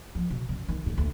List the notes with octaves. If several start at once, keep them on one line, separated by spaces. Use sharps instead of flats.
F3
B2
F#2
D#3
A2 D#3
D2